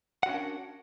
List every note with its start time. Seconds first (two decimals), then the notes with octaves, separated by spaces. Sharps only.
0.23 F#5
0.26 F#4
0.29 C#4
0.32 D4
0.34 A#4